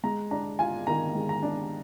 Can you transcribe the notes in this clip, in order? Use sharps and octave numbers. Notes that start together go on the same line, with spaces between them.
G#3 A#5
D4 A#5
F4 G#5
D#3 A#5
G#3
A#5
D4